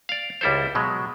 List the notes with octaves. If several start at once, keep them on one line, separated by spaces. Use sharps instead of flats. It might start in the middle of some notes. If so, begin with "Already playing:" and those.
D5 F5
C#2 G3 E4 A4 C5
B2 F#3 G#3